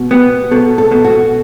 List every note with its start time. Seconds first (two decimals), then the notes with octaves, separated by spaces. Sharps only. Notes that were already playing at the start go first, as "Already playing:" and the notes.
Already playing: B2
0.11 B3 G4
0.51 B2 A4
0.78 A4
0.92 B2
1.04 F#4